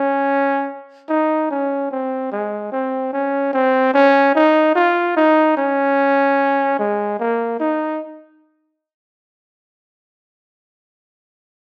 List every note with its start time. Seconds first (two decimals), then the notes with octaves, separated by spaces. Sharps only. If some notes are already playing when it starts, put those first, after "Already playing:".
Already playing: C#4
1.09 D#4
1.51 C#4
1.91 C4
2.32 G#3
2.72 C4
3.13 C#4
3.53 C4
3.94 C#4
4.35 D#4
4.75 F4
5.17 D#4
5.57 C#4
6.79 G#3
7.20 A#3
7.60 D#4